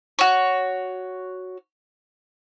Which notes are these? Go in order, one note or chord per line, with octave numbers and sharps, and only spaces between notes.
F#4 C#5